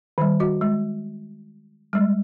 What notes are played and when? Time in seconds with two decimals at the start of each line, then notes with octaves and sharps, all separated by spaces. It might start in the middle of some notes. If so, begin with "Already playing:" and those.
0.18 D#3 G3
0.40 F#4 D#5
0.61 G#3
1.93 G3 G#3